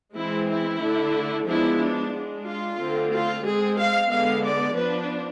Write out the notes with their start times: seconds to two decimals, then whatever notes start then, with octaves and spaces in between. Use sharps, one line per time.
0.16 E3 G#3 C4 E4
0.48 E4
0.81 D3 A3 D4
1.47 F3 G#3 B3 D4 E4
1.80 D4
2.13 G#3 D4
2.46 F4
2.78 D3 A3 C4
3.11 F4
3.44 G#3 C4 G#4
3.77 F5
4.10 D3 G#3 B3 F5
4.42 D5
4.75 F3 B3 D4 B4